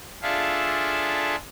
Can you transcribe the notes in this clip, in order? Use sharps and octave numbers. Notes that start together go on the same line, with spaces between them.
D4 F4 G#4 A4 E5 F5